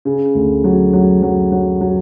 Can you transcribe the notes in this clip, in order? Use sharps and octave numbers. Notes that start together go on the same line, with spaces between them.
C#3
D2
F#3
F#3
F#3
F#3
F#3